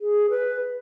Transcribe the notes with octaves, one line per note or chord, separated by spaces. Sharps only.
G#4
B4